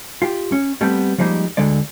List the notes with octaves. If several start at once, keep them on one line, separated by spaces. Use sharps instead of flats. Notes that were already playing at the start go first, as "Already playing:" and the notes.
F4 G4
C#4
G3 A3 B3 C4
F3 G3 G#3 A#3 D#4
D2 D3 G#3 D5